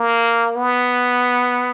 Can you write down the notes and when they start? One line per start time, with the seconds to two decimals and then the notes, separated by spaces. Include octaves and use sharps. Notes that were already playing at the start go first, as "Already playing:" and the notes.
Already playing: A#3
0.56 B3